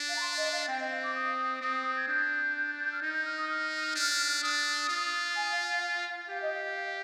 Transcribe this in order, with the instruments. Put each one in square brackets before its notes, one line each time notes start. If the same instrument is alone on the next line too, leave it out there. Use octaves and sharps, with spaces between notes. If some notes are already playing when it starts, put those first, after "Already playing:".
Already playing: [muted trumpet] D4
[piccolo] F5
A#5
C6
D#5
F5
[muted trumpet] C4 [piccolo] G5
[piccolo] D#5
F5
D6
D#6
[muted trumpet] C4
[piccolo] G#6
[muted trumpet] D4 [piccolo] G6
[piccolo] F6
[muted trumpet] D#4 [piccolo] G6
[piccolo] G6
F6
D#6
F6
[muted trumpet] D4
[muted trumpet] D4 [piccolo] D#6
[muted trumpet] F4
[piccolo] G#5
F5
F5
F5
[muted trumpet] G4 [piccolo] F5
[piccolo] D#5
F5
F5